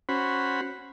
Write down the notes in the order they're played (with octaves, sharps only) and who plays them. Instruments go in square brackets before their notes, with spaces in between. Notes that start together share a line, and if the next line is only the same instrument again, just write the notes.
[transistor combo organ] C#4 F#4 C5 B5